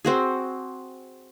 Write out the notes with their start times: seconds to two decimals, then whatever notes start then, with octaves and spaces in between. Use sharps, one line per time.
0.05 C4 F#4 G#4